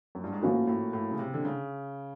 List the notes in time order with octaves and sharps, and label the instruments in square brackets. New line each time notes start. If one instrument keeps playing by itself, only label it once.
[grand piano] F#2
G2
G#2
[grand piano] A2 [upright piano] F3 A#3 C#4 F#4 A#4
[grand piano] A2
A2
C#3
C3
D3
C#3